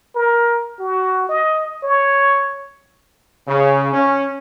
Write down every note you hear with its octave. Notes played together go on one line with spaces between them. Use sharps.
A#4
F#4
D#5
C#5
C#3
C#4